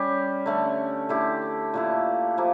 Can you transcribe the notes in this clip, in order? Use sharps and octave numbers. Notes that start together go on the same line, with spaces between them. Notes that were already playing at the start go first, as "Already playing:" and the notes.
Already playing: G3 C#4 G4
D3 A3 C#4
D3 A3 E4 G4
A#2 A3 E4
F3 A#3 E4 G4